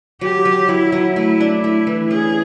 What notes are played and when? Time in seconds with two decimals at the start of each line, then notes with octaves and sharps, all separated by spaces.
0.21 F#3 G4
0.45 F#3
0.69 F#3 E4
0.92 F#3
1.16 A3 E4
1.40 D4
1.64 A3 E4
1.87 E3
2.11 C#4 G#4